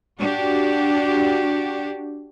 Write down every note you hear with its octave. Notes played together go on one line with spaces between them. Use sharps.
D4 F#4 G4